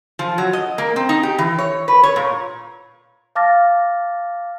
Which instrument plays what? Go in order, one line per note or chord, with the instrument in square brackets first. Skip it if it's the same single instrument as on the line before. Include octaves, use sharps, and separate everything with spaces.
[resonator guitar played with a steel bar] F3
F#3
D#5
A#3
C4
D#4
G4
E3
C#5
B4
C#5
A#2
[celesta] F5 A5 D6 F6 A6 A#6